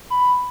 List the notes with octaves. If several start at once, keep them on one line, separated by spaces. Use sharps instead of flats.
B5